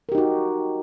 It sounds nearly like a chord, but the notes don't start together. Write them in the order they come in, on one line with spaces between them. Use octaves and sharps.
A#4 G4 D#4 F#4